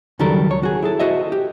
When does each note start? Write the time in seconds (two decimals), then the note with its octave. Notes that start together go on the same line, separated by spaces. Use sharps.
0.19 C#2 D#3 F#3 G3 A4 A#4
0.51 C#5
0.63 F#4 G#4
0.82 E4 G#4 A4
1.00 F#4 C5 D#5 E5
1.32 G4